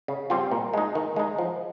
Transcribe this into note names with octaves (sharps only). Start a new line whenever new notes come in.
C#3
G3 C4 F4
A#2
G#3 D#4
D#3
G#3 D#4
F3